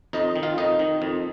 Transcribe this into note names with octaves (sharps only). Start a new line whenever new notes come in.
F2 D#4 D#5
D#3
F4 F5
F2 D#4 D#5
D#3
F2